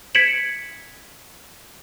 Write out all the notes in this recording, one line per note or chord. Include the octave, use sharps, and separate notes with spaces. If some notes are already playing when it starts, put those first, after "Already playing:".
G#6 B6 C#7 D7 E7 F#7